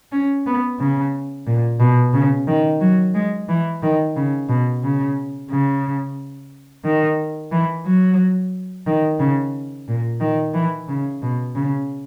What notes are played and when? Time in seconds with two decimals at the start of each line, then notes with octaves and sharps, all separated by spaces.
0.12 C#4
0.46 B3
0.80 C#3
1.47 A#2
1.80 B2
2.14 C#3
2.48 D#3
2.81 F#3
3.15 G#3
3.49 E3
3.83 D#3
4.16 C#3
4.49 B2
4.83 C#3
5.51 C#3
6.85 D#3
7.52 E3
7.86 F#3
8.87 D#3
9.20 C#3
9.88 A#2
10.21 D#3
10.54 E3
10.88 C#3
11.22 B2
11.56 C#3